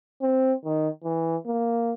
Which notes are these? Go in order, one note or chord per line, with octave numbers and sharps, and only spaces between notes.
C4
D#3
E3
A#3